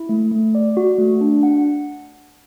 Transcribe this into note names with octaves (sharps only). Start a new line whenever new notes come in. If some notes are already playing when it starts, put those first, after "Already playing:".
Already playing: E4
A3
A3
D5
F#4
A3
D4
F#5